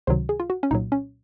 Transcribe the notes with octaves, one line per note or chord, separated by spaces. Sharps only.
C#2 C3 D#3 F#3 C5
G#4
F4
F#4
C#4
C2 A#2 F#3 D#4
C#4